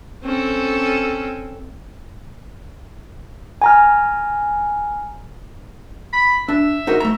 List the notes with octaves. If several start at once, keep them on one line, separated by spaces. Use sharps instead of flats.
C4 C#4 A4
G#5 A#5 F6
B5
D4 E5
D#4 F#4 A#4
A3 A#5